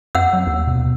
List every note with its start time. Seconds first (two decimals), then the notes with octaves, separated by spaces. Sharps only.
0.15 F2 F#5 E6
0.33 F#3
0.47 D#2
0.67 B2 B3